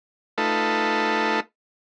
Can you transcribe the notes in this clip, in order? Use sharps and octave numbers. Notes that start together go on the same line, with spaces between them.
A3 D#4 F4 A4 B4